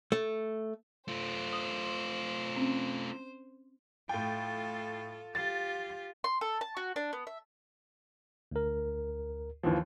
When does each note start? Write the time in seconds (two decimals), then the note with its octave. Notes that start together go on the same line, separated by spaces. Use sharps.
0.12 A3
1.08 A3 F4 C5
1.53 D#6
2.56 C4 C#4
4.09 A2 F4 A4 G5
5.35 F4 G4 A6
6.24 C6
6.41 A4
6.61 A5
6.77 F#4
6.96 D4
7.13 B3
7.27 E5
8.52 D2 A#4
9.63 D#2 E3 F3